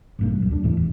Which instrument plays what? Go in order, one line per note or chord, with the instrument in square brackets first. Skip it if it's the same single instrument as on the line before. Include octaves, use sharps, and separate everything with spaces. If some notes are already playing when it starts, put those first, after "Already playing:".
[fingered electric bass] A1 G2 A#2
B1 F#3
D#2 D4
D#2 A2 E3
E1